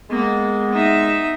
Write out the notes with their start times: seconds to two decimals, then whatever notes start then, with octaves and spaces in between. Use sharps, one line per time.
0.10 G#3 A#3 B3
0.72 D#4 E5